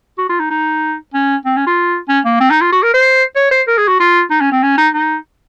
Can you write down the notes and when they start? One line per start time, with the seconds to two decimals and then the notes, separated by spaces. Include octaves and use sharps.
0.18 F#4
0.29 F4
0.39 D#4
0.50 D#4
1.14 C#4
1.46 C4
1.56 C#4
1.67 F4
2.08 C#4
2.25 A#3
2.41 C4
2.50 D#4
2.61 F4
2.72 F#4
2.83 A#4
2.94 C5
3.35 C#5
3.51 C5
3.67 A#4
3.77 G#4
3.88 F#4
4.00 F4
4.30 D#4
4.41 C#4
4.52 C4
4.62 C#4
4.78 D#4
4.94 D#4